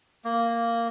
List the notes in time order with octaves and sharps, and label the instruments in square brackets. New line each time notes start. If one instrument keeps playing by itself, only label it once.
[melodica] A#3